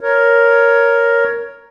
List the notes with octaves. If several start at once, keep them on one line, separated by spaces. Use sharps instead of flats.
A#4 C#5